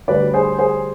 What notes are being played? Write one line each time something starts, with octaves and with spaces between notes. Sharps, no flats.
D2 D3 G3 B4 D5
G#4 C5
G#4 C5